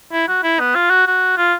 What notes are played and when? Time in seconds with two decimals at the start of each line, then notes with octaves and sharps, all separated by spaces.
0.12 E4
0.28 F#4
0.43 E4
0.59 B3
0.75 F4
0.90 F#4
1.07 F#4
1.37 F4